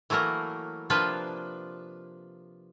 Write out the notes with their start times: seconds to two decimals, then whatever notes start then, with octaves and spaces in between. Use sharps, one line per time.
0.10 E3 F#3 A3 A#3 A#4
0.90 C3 F3 A#3 D4 F4 B4